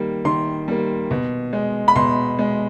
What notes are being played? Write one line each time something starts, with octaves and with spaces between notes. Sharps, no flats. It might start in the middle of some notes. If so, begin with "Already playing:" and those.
Already playing: D#3 G3 A#3
D#3 C6
G3 A#3
B2
G#3
B5
B2 C6
G#3